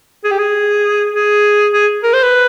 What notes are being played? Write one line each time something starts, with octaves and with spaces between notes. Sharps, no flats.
G#4
G4
G#4
G#4
G#4
A#4
C5
B4